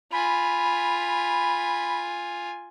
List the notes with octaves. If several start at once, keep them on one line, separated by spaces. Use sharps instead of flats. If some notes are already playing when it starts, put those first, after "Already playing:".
F4 G#5 B5